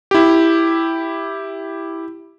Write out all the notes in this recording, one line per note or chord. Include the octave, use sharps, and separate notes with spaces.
E4 G4